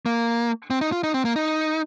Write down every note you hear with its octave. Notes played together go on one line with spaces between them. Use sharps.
A#3
C4
D#4
F4
D#4
C4
A#3
D#4